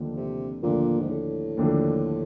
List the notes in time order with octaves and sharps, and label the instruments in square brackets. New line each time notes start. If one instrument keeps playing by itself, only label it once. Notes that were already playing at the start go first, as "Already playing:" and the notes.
Already playing: [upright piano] D#2 D3 F3 A3 D4
[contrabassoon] C3
[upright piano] D#2 D3 F3 A3 D4 [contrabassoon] A#2
[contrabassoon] G#2
A2
[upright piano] D#2 D3 F3 A3 D4